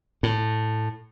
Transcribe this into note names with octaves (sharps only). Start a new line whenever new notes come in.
A2